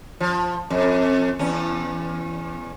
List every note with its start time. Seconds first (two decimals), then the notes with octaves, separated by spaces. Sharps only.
0.20 F3
0.70 F2
1.39 E2 C#4